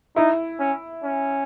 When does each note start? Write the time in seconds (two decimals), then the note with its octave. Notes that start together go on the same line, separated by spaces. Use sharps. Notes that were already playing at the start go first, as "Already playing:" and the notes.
0.16 D#4 E4
0.59 C#4
1.04 C#4